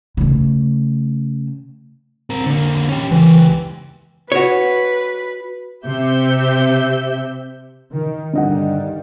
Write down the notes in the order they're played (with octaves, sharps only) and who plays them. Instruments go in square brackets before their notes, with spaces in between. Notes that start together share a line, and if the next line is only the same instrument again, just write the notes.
[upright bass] C#3 A3
[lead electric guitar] C4 A#4
D3 A#3
C#4 G4
[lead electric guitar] C#2 G4 [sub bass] E3
[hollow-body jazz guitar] F#4 C#5 [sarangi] B4
[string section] C3 G4 E5 G6
[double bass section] D#3
[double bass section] G2 D#3 G3 [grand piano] D3 D#5 F#5